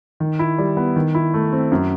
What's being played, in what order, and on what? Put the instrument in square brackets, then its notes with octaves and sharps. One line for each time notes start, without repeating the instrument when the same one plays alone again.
[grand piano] D#3
E4
G3
B3
D#3
E4
A3
C4
F#2